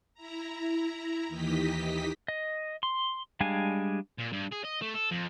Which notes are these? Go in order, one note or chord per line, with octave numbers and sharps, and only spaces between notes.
E4 A#5
D#2 D#3 E3 G4 D#5 B6
D#5
C6
G3 G#3 D4 F5 G#5
A#2
G2
G#4
D#5
A3
A4
F2